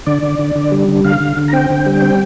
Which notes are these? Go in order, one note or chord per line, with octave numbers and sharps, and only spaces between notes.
D3 D5
D3
D3
D3
G3
D3
D3 F5
D3
D3
A#5
C4 G5
D3
G3
C4